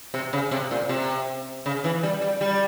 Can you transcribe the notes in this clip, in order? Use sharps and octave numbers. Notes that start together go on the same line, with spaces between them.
C3
C#3
C3
A#2
C3
C#3
E3
G3
G3
G3